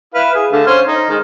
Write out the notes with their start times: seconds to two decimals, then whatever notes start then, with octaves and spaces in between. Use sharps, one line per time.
0.15 E4 B4 F5
0.35 G#4
0.52 D3 A3 F5
0.67 C#4 C5 C6
0.88 D#4
1.09 D#3 G#3